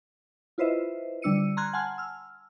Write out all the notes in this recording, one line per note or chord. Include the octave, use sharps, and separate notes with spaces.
E4 F4 B4 C5 D#5 E5
D3 G3 D4 E6 C#7 D#7
A#5 C6 F6 F#6 G#6
F#5 G#5 A5 C6 F6
E6 F6